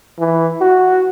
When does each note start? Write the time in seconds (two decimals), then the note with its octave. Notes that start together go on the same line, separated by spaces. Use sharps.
0.19 E3
0.61 F#4